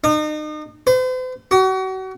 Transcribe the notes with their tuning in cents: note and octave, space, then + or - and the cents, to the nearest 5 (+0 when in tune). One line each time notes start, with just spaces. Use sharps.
D#4 -35
C5 -45
F#4 +35